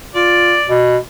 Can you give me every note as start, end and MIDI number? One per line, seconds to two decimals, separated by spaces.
0.15 0.57 65
0.15 0.71 74
0.69 0.97 47